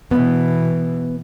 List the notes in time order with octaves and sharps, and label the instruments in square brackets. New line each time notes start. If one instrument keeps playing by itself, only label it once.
[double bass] B2 E3 [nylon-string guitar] B3